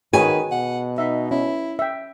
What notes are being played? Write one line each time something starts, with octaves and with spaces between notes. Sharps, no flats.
D#3 F#4 G#4 B4 C#5 G#5
B2 F#5
D#4 E5
C#4 E4
E5 G5